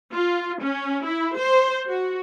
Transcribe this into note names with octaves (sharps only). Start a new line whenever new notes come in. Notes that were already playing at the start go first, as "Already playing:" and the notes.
F4
C#4
E4
C5
F#4